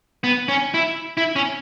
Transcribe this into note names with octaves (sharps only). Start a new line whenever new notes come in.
B3
C#4
E4
E4
C#4